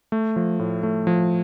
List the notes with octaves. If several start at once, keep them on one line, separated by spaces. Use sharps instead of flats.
A3
F3
A2
A3
F3